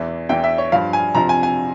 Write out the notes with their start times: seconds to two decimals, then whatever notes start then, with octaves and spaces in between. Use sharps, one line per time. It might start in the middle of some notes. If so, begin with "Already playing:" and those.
Already playing: E2 E3
0.29 E2 E3 G5
0.44 E5
0.58 C#5
0.72 G2 F3 F5
0.93 G#5
1.15 F2 C3 F3 A#5
1.29 G#5
1.43 G#5